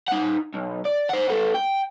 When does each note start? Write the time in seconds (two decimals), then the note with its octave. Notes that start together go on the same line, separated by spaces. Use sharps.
0.08 D#4 F#5
0.54 B1
0.85 D5
1.09 C5 F#5
1.29 B3 A4
1.55 G5